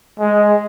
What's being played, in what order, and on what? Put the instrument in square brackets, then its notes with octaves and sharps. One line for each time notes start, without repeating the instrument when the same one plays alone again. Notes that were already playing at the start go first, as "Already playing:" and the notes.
[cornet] G#3